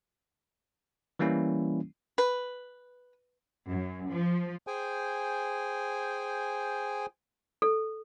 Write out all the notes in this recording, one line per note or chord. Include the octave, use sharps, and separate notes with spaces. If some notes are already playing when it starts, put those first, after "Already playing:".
E3 G3 A#3 C#4 E4
B4
F#2
F3
G#4 C5 G5 G#5
A4